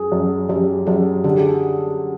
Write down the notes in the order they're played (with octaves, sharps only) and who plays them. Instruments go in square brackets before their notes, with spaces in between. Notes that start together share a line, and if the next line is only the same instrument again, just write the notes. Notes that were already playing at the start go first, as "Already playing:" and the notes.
Already playing: [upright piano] F#2 [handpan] G#4
[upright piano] F#2
[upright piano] F#2 [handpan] G4
[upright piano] F#2 [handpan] G#4
[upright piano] D3 [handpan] G4
[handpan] G#4
G4